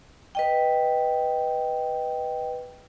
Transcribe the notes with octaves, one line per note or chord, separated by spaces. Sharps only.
B4 D#5 G5